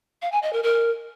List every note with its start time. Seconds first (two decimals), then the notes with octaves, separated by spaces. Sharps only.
0.22 F5
0.32 G#5
0.42 D#5
0.53 A#4
0.63 A#4